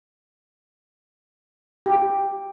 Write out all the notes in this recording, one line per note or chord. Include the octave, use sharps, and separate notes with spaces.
G4